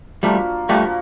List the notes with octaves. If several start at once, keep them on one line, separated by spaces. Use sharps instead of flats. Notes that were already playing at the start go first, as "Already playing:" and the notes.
F3 G3 A3 A#3 D4 F#4
F3 G3 A3 A#3 D4 F#4